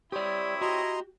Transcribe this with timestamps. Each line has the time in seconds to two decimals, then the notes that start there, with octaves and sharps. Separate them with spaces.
0.12 C4 E4 G4 C#5 D5 D#6
0.61 F#4 G4 D#5 A#5 C6